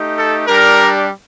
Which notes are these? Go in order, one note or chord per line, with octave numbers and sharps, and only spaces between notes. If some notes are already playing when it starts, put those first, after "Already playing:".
Already playing: A3 D#4 G4
A4
G3 D4 G4 A#4